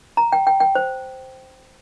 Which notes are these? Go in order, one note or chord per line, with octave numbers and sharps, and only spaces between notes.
A#5
G5
G5
G5
C5